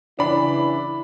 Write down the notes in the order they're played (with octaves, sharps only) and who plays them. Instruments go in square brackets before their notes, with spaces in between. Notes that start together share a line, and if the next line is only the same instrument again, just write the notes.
[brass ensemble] C#3 E3 E4 [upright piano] D4 B5